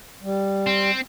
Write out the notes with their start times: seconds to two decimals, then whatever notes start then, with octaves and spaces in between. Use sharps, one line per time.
0.23 G3
0.67 C4